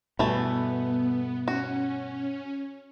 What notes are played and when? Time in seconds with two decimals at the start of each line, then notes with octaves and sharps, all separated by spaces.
0.19 G2 B2 E3 A3 B3
1.48 C#4 F#4